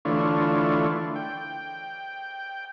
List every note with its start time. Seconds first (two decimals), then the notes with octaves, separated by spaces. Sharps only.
0.05 D3 E3 A3 D4 F4 C#5
1.16 G5